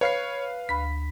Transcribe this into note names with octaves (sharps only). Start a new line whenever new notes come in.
B4 C#5 F5 C7
D2 B5 B6